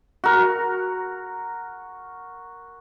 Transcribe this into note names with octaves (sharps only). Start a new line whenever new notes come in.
F#4 A#4